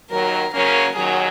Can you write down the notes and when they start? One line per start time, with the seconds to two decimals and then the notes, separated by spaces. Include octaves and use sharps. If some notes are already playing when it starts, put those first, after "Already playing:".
0.10 D#2 D#3 F#3 A#4
0.53 C#3 F#3 A#3 C#4 A#4
0.96 D#2 D#3 F#3 G#4